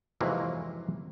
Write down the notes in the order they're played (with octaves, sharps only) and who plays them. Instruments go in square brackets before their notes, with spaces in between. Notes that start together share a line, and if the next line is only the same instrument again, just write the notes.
[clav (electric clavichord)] F2 G#2 C3 E3 F#3 A#3